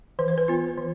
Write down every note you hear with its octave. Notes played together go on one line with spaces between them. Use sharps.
E3 B4
C5
B4
B3 F4
E3